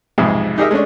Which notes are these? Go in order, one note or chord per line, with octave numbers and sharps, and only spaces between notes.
B1 F2 G#2 C3 G#3
D#4 G4 G#4 A#4 D#5 E5
G#3 A3 C#4 D4